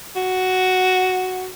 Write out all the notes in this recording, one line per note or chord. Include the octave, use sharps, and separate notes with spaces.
F#4